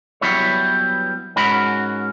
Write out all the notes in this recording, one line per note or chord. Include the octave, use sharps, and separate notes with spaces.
F#3 G3 B3 E4 B4 C#5
G#2 C#4 F#4 A#4 B5